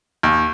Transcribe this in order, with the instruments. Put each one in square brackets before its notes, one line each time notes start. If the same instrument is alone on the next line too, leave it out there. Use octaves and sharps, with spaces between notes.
[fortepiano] D#2